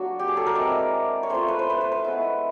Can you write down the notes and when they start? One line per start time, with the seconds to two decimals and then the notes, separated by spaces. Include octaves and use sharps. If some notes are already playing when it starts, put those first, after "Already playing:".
Already playing: F#3 A#3 D4 F#4
0.19 G4
0.28 G#4
0.37 A4
0.47 A#4
0.55 G#3 C4 E4 D5
1.23 C#5
1.30 A3 C#4 F4 C5
1.48 B4
1.59 C5
1.70 B4
1.81 C5
1.92 B4
2.05 G#3 B3 E4